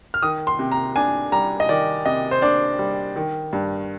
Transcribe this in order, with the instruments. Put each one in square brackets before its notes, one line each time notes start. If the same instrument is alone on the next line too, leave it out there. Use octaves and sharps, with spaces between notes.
[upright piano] F6
D#3 D#6
C6
C3
A#5
D4 G#5
G3 A#5
D#5
D#3 D5
C3 D#5
C5
D4 D5
G3
D#3
G2